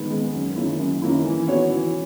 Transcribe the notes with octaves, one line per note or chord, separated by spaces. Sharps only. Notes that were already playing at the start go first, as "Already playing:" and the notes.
Already playing: D#3 G#3 B3
G#3 B3
F#2
D#3 A#3 C#4 E4
F#2
D#3 A#3 C#4 E4
E3
B3 F#4 C#5
E3